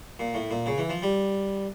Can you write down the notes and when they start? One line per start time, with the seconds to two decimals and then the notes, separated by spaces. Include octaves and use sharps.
0.19 A#2
0.34 A2
0.51 A#2
0.66 C#3
0.78 E3
0.89 F3
1.02 G3